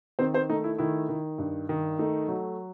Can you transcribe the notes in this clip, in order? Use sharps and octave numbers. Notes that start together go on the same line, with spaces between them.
D#3 C4 C5
C4 C5
A3 D#4
E4
D#3 E4
D#3
G2
D#3
A3 D#4
F#3